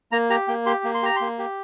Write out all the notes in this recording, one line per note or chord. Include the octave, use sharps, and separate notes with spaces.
A#3 A#5
G4 A#5
A#3 G5
G4 C6
A#3
C6
G4 A#5
A#3 C6
G4